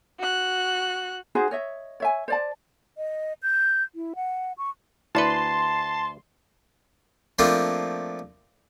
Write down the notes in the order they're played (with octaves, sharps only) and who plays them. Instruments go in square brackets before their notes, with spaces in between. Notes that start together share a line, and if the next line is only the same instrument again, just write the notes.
[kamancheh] F#4 F#6
[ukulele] D#4 F#4 G#4 C5
C#5 D#5 E5
C#5 E5 G#5
C5 D5 A5
[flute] D#5
G6
E4
F#5
C#6
[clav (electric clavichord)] D2 B4 [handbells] E4 D5 C#7 [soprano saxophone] A5 [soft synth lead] C6
[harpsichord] F3 A3 A#3 C4 D4 F4